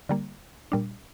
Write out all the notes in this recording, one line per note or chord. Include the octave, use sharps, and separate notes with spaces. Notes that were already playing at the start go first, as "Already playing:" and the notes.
D3 G3 A#3
A#2 G3 D4